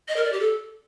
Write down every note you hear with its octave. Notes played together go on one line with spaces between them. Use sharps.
D#5
A#4
D5
G4
A4